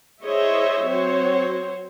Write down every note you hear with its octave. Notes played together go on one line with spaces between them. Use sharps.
E4 G#4 C5 C#5 D#5 E5
F#3 C4 F#4 C5 C#5